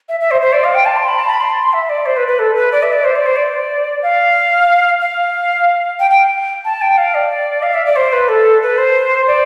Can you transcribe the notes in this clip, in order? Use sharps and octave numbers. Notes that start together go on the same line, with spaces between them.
E5
E5
C5
C5
D5
F5
G5
A5
C6
B5
A5
B5
C6
E5
D5
C5
B4
B4
A4
B4
D5
E5
D5
C5
D5
C5
D5
F5
F5
G5
G5
A5
G5
F5
D5
F5
E5
D5
C5
B4
A4
B4
C5
D5